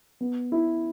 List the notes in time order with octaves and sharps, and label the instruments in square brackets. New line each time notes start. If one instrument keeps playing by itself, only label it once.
[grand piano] B3
E4